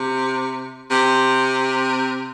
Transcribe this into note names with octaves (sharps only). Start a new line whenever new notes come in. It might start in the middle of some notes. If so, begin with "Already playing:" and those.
Already playing: C3
C3